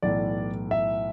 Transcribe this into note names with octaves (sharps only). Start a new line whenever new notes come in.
B1 A2 E3 D5
E5